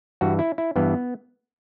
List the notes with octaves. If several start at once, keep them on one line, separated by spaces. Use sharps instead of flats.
G2 E3 F#4
E4
E4
G2 E3 B3